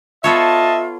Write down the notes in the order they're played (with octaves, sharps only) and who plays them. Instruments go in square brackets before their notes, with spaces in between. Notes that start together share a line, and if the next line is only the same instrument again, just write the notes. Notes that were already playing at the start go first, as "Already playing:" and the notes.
[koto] B3 A4 C#5 [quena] F4 [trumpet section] D#5 A5 [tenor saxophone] E5